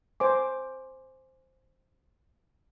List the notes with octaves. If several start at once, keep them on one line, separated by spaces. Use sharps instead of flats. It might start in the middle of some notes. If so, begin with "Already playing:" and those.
C5 G#5 D6